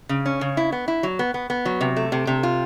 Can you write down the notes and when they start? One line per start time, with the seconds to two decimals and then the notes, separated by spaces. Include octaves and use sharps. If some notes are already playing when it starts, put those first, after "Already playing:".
0.09 C#3
0.26 C#4
0.41 C#3
0.57 E4
0.72 B3
0.88 E4
1.03 F#3
1.19 B3
1.34 B3
1.50 B3
1.65 F#3
1.81 C3
1.96 A3
2.12 C3
2.27 C3
2.43 F4